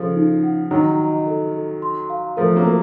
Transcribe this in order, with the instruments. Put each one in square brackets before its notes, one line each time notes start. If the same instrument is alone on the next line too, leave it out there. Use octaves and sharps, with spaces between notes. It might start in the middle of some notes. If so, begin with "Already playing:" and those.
Already playing: [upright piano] C#3 F3 [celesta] A4
[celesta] D#4
F#5
[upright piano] D#3 F#3 [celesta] F#5
[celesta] D#5
A4
A4
C6
F5
[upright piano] F3 A3 [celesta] A#4
[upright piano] F#3 A#3
[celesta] A#4